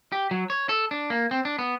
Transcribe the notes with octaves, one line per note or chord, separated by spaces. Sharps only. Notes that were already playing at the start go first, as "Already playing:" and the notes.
G4
F#3
C#5
A4
D4
A#3
C4
D4
B3